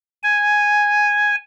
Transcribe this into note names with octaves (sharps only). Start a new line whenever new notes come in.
G#5